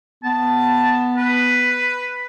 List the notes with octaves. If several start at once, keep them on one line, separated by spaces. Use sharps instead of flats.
B3 A5
B4